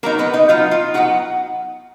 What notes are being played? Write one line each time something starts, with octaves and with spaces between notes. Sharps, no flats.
F#3 A#3 B3 D#4 A#4
B3 B4
D#4 D#5
F#3 B3 D#4 F4 F5
F4 F5
F#3 B3 D#4 F#4 F#5